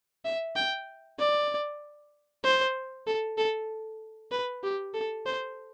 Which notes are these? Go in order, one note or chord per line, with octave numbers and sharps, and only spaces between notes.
E5
G5
D5
C5
A4
A4
B4
G4
A4
C5